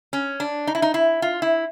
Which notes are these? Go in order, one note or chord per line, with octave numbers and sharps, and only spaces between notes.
C#4
D4
D#4
E4
D#4
E4
F4
E4